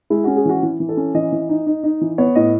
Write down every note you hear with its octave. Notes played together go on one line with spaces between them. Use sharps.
G#3 E4
C#4 F#4
G#4
E3 F#4
E3
E3
A4
C#4
E3 D#5
E3
D#4
D#4
D#4
E3
B3 C#5
A2 D#5